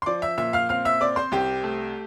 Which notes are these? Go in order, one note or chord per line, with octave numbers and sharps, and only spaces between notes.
C6
F3 D5 D6
E5 E6
A#2 E5 E6
F5 F6
C4 F5 F6
E5 E6
C4 D5 D6
C5 C6
C2 G4 G5
A3